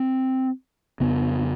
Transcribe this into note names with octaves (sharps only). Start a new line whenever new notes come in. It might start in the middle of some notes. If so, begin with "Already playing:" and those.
Already playing: C4
F2 C#3 B3